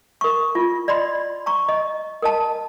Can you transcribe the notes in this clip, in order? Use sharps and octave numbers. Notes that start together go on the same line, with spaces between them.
A#4 C#6
F4
D5 D#5 B5 C6
A#5 C#6
D#5
A#4 D#5 A5